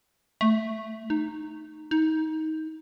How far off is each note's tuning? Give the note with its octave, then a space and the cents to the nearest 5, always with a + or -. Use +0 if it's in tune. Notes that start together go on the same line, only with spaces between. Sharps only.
A3 +0
D#4 -15
D#4 +20